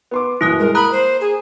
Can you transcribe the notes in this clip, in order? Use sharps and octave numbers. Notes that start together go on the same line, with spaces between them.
B3 C6 D6
F#2 A#2 E3 E4 D#6 F#6
G#3 A#4
A#3 A#5 B5 D#6 F#6
C5
G#4